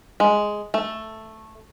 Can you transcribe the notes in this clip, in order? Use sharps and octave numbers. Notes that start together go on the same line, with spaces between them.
G#3
A3